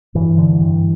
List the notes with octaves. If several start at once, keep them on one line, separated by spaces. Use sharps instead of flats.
G2 E3
D3
G2